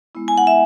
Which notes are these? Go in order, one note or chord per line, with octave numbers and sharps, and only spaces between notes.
G#3 B3 E4
G#5
F#5
E5